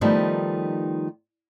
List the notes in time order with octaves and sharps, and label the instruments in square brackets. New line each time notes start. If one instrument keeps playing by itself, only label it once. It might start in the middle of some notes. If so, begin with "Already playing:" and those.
[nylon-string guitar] D#3 F3 G3 A3 B3 D#4